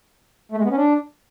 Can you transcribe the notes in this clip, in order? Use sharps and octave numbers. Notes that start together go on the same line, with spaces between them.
A3
G#3
B3
C#4
D4